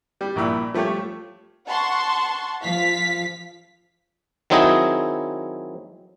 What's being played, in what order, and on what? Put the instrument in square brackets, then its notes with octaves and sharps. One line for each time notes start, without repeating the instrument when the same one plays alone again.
[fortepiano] G3
A#1 A#2 E4 B5 E6
F3 A3 G4 A4 C#5
[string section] F#5 A5 C6 C#6
F3 F5 B6
[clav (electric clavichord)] D#3 F#3 C4 D#4 E4 G#4